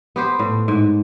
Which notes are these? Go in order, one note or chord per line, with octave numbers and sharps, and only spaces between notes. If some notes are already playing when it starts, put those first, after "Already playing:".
B3 G4 C5
A2
G#2